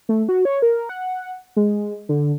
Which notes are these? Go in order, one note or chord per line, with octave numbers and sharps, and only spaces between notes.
A3
F#4
C#5
A#4
F#5
G#3
D3